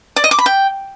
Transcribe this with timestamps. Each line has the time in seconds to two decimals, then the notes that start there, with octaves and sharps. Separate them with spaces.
0.16 D5
0.24 D#5
0.31 D6
0.38 B5
0.46 G5